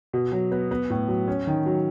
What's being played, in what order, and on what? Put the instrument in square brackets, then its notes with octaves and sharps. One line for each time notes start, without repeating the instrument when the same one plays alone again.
[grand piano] B2
F#3
B3
B3
A2
F#3
C#4
D#3
F#3